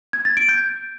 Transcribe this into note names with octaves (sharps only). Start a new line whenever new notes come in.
G#6
A6
D7
G6